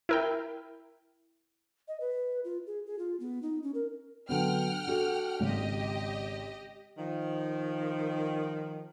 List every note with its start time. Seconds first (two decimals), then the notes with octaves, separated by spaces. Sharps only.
0.09 E4 A#4 G5
1.88 D#5
2.00 B4
2.44 F4
2.66 G#4
2.86 G#4
2.99 F4
3.20 B3
3.42 D#4
3.63 C#4
3.74 A#4
4.29 D3 F#3 B3 F#5 G5 F6
4.87 D4 F#4 A4
5.40 G#1 C#3 G4 D#5
6.98 D#3 F3